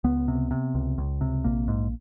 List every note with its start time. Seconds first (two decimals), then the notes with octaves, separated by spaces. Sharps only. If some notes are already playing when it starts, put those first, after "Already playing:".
0.04 C#2 B3
0.28 C3
0.51 C3
0.75 C#2
0.98 C#2
1.21 C3
1.44 A#1 A#3
1.68 G#2